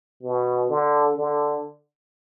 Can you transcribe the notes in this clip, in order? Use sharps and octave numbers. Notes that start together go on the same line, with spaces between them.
B2
D3
D3